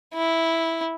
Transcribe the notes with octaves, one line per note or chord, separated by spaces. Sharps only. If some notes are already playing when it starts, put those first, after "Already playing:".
E4